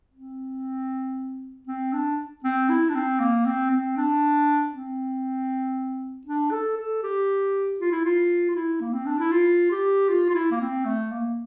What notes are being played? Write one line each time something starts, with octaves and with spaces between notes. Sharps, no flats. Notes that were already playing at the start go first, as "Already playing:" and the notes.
C4
C4
D4
C4
E4
D4
C4
A#3
C4
C4
D4
C4
D4
A4
A4
G4
F4
E4
F4
F4
E4
A#3
C4
D4
E4
F4
G4
F4
F4
E4
A#3
C4
A3
A#3